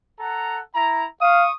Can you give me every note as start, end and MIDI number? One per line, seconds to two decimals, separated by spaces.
0.19 0.59 69
0.19 0.59 78
0.19 0.59 82
0.74 1.04 64
0.74 1.04 82
1.21 1.47 77
1.21 1.52 85
1.21 1.52 87